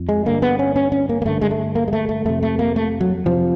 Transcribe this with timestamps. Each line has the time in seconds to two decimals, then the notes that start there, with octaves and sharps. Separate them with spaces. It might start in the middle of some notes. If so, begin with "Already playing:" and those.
Already playing: F2
0.09 G#3
0.26 G2 D3 A#3
0.42 B3
0.59 C#4
0.76 C#4
0.92 C#4
1.09 A#3
1.22 A#3
1.25 G2 D3 A3
1.41 G#3
1.51 A3
1.75 A#3
1.88 G#3
1.93 A3
2.09 A3
2.25 F2 C3 A3
2.43 A3
2.59 A#3
2.76 A3
3.01 F#3
3.25 F2 C3 F3